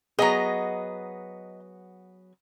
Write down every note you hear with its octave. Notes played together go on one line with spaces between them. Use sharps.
F#3 B3 G#4 D#5 A#5